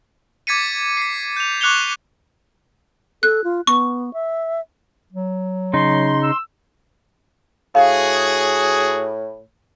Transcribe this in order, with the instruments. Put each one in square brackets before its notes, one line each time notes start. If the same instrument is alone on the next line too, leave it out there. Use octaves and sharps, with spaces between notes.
[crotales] D6 G#6 A6 B6 C#7 D#7
B6 C7
G6 F7
C#6 D6 F#6 C#7 F7 G7
[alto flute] A4 [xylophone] F#6
[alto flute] F4
[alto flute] B3 [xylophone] C#6
[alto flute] E5
[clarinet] F#3
[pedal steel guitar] C#3 D#4 [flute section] C6
[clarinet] E6
[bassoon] A2 [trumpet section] F#4 G#4 [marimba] F5